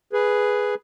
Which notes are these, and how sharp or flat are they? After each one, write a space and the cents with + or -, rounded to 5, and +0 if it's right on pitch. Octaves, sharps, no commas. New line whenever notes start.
G#4 +0 B4 +0